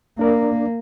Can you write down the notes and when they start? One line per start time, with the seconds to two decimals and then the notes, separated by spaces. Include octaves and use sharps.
0.19 A#3 D4 A#4 D5